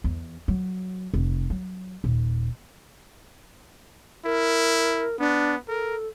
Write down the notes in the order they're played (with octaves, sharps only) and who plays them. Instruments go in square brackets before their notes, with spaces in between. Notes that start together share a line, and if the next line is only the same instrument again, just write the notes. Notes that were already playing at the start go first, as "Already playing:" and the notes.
[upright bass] E2
F#3
F1
F#3
D#1
[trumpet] E4 [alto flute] A#4
[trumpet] B3 [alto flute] D4
[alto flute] A4 [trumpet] A#4